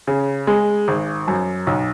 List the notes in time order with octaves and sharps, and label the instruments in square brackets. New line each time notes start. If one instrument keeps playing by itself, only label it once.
[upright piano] C#3
G#3
G#1
F#2
B1